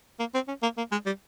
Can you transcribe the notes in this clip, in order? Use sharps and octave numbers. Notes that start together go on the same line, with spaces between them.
A#3
C4
C#4
A#3
A#3
G#3
G3